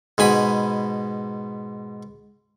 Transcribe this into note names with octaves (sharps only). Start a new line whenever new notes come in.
G#2 B2 G#5 B5